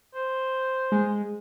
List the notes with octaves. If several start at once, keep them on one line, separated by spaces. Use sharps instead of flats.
C5
G#3